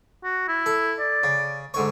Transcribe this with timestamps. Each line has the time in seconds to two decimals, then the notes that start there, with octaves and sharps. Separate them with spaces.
0.24 F#4
0.48 E4
0.66 A4
0.99 D5
1.23 C#3
1.74 G#2 D3 C#5